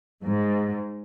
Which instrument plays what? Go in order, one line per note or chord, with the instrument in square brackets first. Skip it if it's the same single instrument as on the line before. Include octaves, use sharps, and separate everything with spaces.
[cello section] G#2